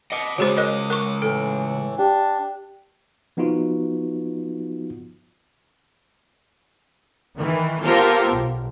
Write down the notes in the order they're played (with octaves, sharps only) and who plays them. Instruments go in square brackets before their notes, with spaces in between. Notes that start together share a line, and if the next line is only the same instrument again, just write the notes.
[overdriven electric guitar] D#5 F#5 [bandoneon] D6 D#6
[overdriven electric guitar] C#3 G#3 [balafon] F#4 G#4 C5 [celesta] C#5
[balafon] A#4 D#5
A#4 C#6
[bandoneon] A2 E3 [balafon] A4 [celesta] D7
[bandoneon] D4 [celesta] G4 G5
[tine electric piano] F3 B3 D#4 F4 F#4
[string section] D#3 E3
B3 F4 G4 A4 A#4 C5
B1